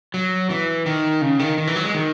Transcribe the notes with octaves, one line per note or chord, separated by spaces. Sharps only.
F#3
E3
D#3
C#3
D#3
D#3
E3
F#3
G#3
D#3